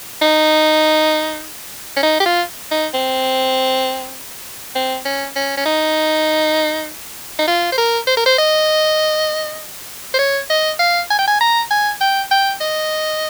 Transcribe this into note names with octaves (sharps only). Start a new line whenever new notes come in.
D#4
C#4
D#4
G4
F4
D#4
C4
C4
C#4
C#4
C#4
D#4
D#4
F4
C5
A#4
C5
A#4
C5
D#5
C5
C#5
D#5
F5
G#5
G5
G#5
A#5
G#5
G5
G5
D#5